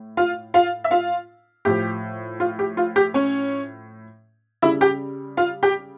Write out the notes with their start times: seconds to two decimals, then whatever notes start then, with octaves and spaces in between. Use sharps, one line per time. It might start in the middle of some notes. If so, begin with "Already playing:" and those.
Already playing: A2
0.17 F4 F5
0.54 F4 F5
0.84 E5
0.91 F4 F5
1.65 A2 F3 G4
2.40 F4
2.59 G4
2.77 F4
2.96 G4
3.14 C#4 C#5
4.62 C#3 G3 E4 E5
4.81 G4 G5
5.37 F4 F5
5.63 G4 G5